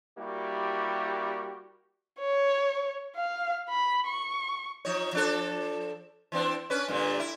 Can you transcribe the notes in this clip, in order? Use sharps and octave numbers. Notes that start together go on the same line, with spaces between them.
G3 A#3 E4 F#4 G4
C#5
F5
B5
C#6
F3 D#4 C#5
F3 D4 A4
E3 C4 D4
C#4 D4 B4
G2 A#2 D3
E4